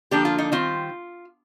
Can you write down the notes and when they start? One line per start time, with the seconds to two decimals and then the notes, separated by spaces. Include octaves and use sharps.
0.11 D3 F3 A#3 D4 G4
0.25 F4
0.38 D#4
0.52 D#3 G3 C4 F4